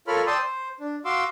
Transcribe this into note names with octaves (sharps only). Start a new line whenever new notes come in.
F4 A4 A#4 C#5 B5 F6
D5 G5 A5 C6 D#6 E6
C5
D4
F#4 F5 C6 D6 E6